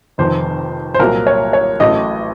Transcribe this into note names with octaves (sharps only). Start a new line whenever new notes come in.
F1 F2 D#3 C5
C5
C2 A#2 F#3 A#3 A#4
C#5
C#5
A1 A2 F#3 A3 D#5